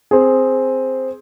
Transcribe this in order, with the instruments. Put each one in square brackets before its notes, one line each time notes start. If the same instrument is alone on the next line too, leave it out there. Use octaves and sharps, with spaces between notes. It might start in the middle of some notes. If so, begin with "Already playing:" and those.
[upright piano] C4 G#4